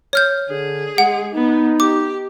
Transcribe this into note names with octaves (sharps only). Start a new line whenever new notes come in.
C#5 F6 G6
D3 G#4
G#3 F#5
B3 D#4
G4 D6